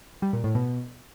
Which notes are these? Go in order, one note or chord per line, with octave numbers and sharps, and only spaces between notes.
G3
A#2
A2
B2